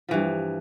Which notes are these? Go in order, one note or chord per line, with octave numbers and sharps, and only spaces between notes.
G2 E3 F3